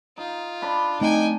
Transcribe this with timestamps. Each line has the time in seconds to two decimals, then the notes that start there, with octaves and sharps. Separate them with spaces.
0.18 D#4 F4
0.62 D4 B5
1.01 A3 C4 D#4 G5 G#5